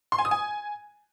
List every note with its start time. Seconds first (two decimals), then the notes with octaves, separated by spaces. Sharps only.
0.12 C6
0.18 G#5
0.25 D#6
0.31 G#5